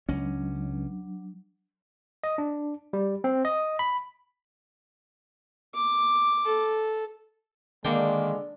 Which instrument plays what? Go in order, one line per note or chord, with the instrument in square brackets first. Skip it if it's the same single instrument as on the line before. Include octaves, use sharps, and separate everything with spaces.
[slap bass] C#2 C#4 [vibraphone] F#3 D4
[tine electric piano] D#5
D4
G3
C4
D#5
B5
[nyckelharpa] D6
[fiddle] A4
[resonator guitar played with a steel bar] D3 [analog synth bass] D#3 [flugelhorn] G#3 [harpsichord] A#3 G5